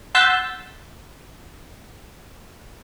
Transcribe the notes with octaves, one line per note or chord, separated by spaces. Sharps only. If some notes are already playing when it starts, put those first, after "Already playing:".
F#5 C6 E6 G6 A6 B6